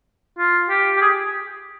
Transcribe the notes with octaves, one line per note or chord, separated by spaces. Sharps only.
F4
G4
G4
G#4